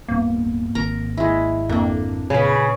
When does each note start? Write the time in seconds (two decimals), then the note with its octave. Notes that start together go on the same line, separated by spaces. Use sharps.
0.08 D1 G2 A#3 B3
0.75 G#1 A#4 A#5
1.17 G#3 E4
1.69 F2 A#3 D4
2.30 A#2 C#3 G#4 B4